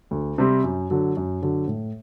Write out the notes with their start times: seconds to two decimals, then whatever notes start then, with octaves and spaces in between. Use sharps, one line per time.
0.11 D2
0.38 C3 G3 C4
0.64 F#2
0.90 D3 F#3
1.17 F#2
1.42 D3 F#3
1.68 A2